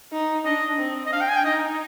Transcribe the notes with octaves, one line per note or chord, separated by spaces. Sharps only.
D#4
D4 D#5
C4
D#5
D4 F5
G5
G#5
G5
D#4 D#5